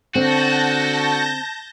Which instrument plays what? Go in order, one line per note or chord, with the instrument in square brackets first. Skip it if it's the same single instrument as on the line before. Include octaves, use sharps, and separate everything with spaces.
[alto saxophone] D3 [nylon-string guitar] C4 [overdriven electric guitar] F#4 [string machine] A5 G6 A#6